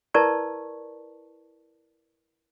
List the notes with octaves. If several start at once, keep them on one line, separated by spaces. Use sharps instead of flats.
E4 A#4 B4 D5 A5 C#6